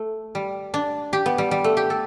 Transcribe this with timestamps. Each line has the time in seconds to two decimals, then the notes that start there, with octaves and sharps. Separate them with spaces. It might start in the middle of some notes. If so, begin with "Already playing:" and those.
Already playing: A3
0.35 G3
0.74 D4
1.13 G4
1.26 B3
1.38 G3
1.51 G3
1.64 A3
1.77 G4
1.90 A4